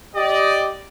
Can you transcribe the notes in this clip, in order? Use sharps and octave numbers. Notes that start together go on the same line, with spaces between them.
G4 D5 D#5